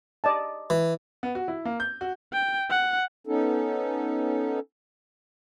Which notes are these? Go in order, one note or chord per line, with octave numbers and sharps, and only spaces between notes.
D5 D#5 A5
E3
B3
F#4
E4
A#3
G6
F#4
G5
F#5
B3 C#4 D#4 A4